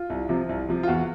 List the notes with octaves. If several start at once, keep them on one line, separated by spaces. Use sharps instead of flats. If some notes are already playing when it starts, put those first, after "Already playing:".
Already playing: F4
C2
C3 F3
C2
C3 F3
F4
E2 F#4